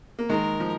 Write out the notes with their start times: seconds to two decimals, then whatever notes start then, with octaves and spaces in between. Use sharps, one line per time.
0.19 A#3
0.29 D#3 G#3 A#4
0.60 F3